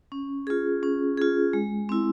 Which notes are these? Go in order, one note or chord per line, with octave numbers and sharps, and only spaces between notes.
C#4
F4 G#4
C#4
F4 G#4
G#3
C4 E4